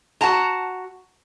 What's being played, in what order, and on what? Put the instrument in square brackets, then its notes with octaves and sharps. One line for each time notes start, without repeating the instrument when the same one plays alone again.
[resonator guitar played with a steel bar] F#4 F#5 A5 A#5